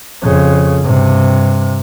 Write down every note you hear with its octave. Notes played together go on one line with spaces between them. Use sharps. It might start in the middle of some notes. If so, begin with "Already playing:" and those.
F2 C#3
G2 C3